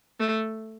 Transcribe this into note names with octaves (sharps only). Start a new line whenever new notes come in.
A3